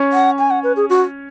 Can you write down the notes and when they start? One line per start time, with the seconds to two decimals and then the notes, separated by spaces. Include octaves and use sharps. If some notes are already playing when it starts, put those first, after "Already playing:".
Already playing: C#4 C#5
0.13 F#5
0.38 G#5
0.51 F#5
0.64 B4
0.76 G#4
0.90 F#4